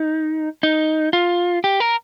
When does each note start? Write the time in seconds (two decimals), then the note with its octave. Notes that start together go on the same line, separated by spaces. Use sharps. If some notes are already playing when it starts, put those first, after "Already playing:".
Already playing: D#4
0.63 D#4
1.13 F4
1.64 G4
1.80 A#4